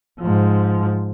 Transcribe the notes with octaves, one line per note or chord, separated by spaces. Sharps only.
G#2 F3